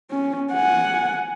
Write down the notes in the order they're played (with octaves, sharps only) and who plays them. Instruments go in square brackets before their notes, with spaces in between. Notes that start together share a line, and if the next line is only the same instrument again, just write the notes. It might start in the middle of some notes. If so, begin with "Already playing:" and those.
[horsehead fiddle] C#4
F#5 G#5